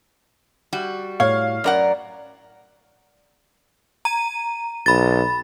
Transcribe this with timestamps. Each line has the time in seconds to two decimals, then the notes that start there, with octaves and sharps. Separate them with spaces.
0.73 G3 F#4
1.20 A2 C#5 F5
1.64 F#2 A#4 D5 F#5
4.05 A#5 D#7
4.86 B1 B5 A6